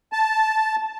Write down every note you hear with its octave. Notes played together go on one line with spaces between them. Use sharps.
A5